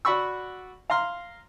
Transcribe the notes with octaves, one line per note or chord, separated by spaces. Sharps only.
F#4 D5 F#5 B5 C#6 E6
F5 A#5 C6 F6